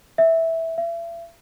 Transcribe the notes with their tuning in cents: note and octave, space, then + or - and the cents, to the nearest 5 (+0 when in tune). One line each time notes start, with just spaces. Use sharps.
E5 -10
E5 +40